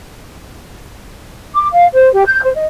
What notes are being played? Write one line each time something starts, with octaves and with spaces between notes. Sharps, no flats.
D6
F5
C5
G4
G6
C5
D#5